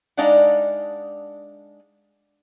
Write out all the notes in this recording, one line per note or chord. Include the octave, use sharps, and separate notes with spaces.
G#3 D4 D#4 D5 F5 F#5